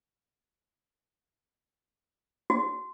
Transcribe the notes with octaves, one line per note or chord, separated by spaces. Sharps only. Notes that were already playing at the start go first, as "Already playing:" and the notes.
F#4